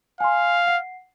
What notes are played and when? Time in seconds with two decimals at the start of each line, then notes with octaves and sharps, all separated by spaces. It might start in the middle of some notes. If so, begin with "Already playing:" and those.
0.20 F5 G#5 C6
0.67 F#5 C7